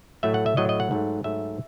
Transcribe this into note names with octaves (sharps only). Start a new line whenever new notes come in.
A2 F#3 A3 E5
F#5
E5
A2 F#3 A3 D#5
D#5
F#5
G#2 F#3 A3
G#2 F#3 A3 E5